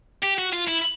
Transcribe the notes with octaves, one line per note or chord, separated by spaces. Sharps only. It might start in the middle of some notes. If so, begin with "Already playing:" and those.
G4
F#4
F4
E4